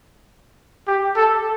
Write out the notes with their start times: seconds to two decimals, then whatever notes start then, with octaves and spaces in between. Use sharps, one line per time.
0.88 G4
1.16 A4